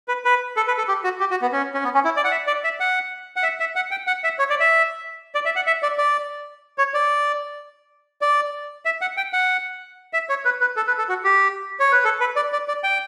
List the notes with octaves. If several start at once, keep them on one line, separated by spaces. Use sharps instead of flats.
B4
B4
A4
B4
A4
G4
F#4
G4
F#4
B3
C#4
C#4
B3
C#4
E4
D5
F#5
E5
D5
E5
F#5
F#5
E5
E5
F#5
G5
F#5
E5
C#5
D5
E5
D5
E5
F#5
E5
D5
D5
C#5
D5
D5
E5
F#5
G5
F#5
E5
C#5
B4
B4
A4
B4
A4
F#4
G4
C#5
B4
A4
B4
D5
D5
D5
G5